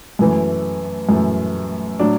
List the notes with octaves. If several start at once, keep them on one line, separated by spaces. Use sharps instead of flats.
F#2 E3 A3
F#2 E3 A3
A2 F#3 D4